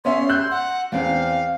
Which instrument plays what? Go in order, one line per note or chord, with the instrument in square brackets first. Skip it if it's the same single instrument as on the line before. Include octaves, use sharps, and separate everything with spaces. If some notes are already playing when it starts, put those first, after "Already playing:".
[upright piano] B3 C#4 E5 [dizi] C6
[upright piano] E6 F#6 G6
[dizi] F#5
[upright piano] E2 C4 [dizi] F5